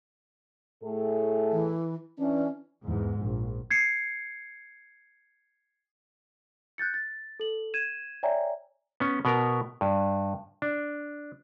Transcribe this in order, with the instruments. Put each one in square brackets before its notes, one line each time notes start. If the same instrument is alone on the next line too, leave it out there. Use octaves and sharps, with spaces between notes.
[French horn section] A2 G#4 A4
[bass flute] E3
[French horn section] E3 D4 [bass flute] C#4
[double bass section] E2 G#2
A#1
[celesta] G#6 C7 C#7
F#6 G6 A6 C#7
A6
A4 F#7
G#6 D#7 E7
C#5 D5 E5 G5 G#5 A#5
[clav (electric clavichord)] B3 C#4
B2 B3 A#4
G2
D4